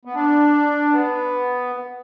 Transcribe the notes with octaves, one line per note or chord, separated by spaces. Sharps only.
B3
D4
B3